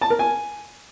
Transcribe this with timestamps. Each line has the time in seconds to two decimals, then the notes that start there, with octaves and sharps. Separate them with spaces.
0.01 A5
0.10 A#4
0.19 G#5